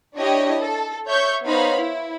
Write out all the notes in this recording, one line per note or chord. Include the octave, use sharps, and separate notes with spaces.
D4 E4 G4 C#5 D#5
A4
C#5 E5 C#6 G6
B3 D#4 C5 C#5 F5 B5
E4